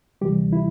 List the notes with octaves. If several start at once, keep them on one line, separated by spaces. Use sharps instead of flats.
D2 C3 E3 G3 G4
E4